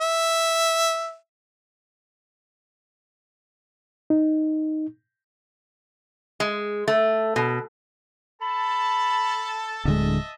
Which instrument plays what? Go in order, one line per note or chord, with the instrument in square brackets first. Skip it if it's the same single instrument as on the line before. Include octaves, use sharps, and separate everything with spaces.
[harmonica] E5
[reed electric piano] D#4
[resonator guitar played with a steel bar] G#3
A3
B2
[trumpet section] A4 A5 [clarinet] B5
[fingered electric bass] D1 D3 G#3 [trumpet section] D#5 E5 A5